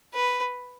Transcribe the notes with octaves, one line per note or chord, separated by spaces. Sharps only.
B4